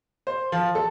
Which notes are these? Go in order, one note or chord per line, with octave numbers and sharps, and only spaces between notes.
C5
F3
A4